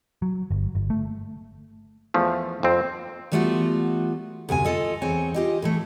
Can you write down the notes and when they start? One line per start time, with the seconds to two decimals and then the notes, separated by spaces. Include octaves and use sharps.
0.22 F#3
0.51 G1
0.75 G1
0.90 A3
2.14 E2 F3 A3
2.63 F2 C4
3.32 E3 G3 A3 B3 F4 F#4
4.49 D2 G2 C3 G#5
4.64 F4 A4 D#5
5.02 E2 C4 C#5 G#5
5.34 F4 G4 D#5
5.62 A2 E3 A3